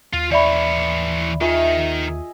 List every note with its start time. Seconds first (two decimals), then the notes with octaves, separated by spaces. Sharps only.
0.14 D#2 F4
0.32 E3 C#5 D5 E5 B5
1.41 D#3 F4 G#4 D#5 E5